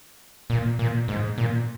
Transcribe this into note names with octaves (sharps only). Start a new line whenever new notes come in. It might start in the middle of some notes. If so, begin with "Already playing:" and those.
A#2
A#2
G#2
A#2